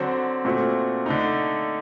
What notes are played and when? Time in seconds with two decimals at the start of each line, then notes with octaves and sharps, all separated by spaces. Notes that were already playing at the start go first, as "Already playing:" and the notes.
Already playing: D3 F#3 C4 F#4
0.45 A#2 A3 C4 F#4 A4
1.06 D3 A3 D#4